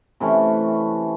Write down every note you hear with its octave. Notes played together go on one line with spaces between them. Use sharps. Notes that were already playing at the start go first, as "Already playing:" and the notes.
C3 E3 A3 C#4